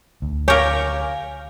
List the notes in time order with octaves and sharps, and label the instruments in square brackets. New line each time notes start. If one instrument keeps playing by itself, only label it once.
[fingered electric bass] D2
[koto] G4 A#4 [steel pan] C#5 [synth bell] F5 G#5